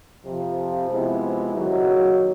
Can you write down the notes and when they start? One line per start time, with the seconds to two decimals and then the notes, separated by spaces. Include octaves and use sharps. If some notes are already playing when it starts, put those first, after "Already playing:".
0.24 F2 C3 F3
0.89 C3 F3 G#3 B3 E4
1.54 D#2 C#3 F#3